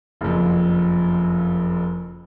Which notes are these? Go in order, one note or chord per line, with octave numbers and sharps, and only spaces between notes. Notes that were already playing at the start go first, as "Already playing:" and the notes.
F#1 F2